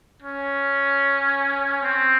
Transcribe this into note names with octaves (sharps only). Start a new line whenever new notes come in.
C#4
C4